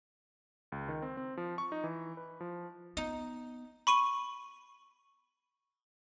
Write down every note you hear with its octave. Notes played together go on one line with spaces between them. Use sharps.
C#2
D#3
C4
C4
F3
C#6
D#4
E3
B4
F3
B3 D#4
B5 C#6 D#7